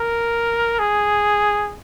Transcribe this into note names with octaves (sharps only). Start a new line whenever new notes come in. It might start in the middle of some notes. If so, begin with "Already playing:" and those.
Already playing: A#4
G#4